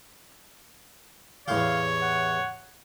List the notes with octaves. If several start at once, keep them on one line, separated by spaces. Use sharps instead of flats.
E2 A2 G4 C#5 F5
F#5